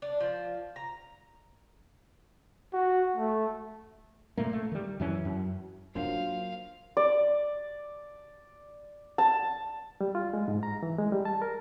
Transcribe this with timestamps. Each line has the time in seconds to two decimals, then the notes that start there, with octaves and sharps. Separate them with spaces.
0.02 D4
0.20 F3
0.76 A#5
2.74 F#4
3.16 A3
4.37 A#2 A3 A#3
4.53 A3
4.72 D#3 G3
5.00 F#2 E3 C#4
5.25 F#2
5.95 F#3 A#3 D4 F4 C5 F5
6.97 D5
9.18 A5
10.01 G3
10.15 F4
10.34 G#3
10.48 G#2
10.63 A#5
10.83 E3
10.98 G#3
11.12 G3
11.25 A5
11.42 A#4